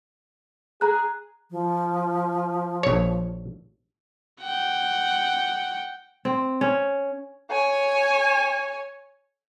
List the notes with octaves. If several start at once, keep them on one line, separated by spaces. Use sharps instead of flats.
G#4 A#5 F#6
F3
A#1 C#5
F#5 G5
C4
C#4
C#5 G#5